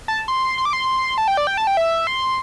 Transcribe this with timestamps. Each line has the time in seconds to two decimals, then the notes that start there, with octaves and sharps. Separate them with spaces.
0.08 A5
0.28 C6
0.58 C6
0.65 D6
0.73 C6
1.18 A5
1.28 G5
1.37 D5
1.47 G5
1.57 A5
1.67 G5
1.77 E5
2.07 C6